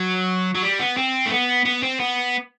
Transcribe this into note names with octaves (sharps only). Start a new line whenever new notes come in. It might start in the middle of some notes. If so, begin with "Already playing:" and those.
Already playing: F#3
F#3
G3
B3
C4
A3
B3
B3
C4
B3